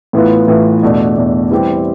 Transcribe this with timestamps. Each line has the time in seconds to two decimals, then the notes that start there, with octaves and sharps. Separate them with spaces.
0.13 A2 E3 B3 F4
0.48 A2 E3 B3 F4
0.82 E2 B2 A3 D4
1.17 E2 B2 A3 D4
1.51 E3 G3 C4 G4